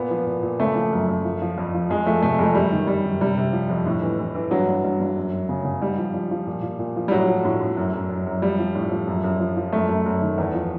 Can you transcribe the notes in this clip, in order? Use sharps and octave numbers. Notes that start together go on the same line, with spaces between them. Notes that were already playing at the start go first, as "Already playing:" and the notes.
Already playing: A#2 B3
F3
A#2
A#2
C#3 A3
F3
F#2
F#2
F3
F3
F2
F3
F2 G#3
F3 A3
C3 A3
F2 G#3
F#2 G3
D#3
D#3 G3
F#2
C3 G3
C3
F3
F2
A2
E3
E3
E3
G2 F#3
G2
G2
G2
F#2
F#2
C#3
C#3
G#2 G3
F3
F3
F3
A#2
A#2
A#2
F3
G3
A2 F#3
F3
A2
A2
F#2
F#2
F#2
F#2
F3 G3
F3
A2
F3
F#2
F#2
F3
F3
F#2 A3
F#2
F#2
D#3
E2
F3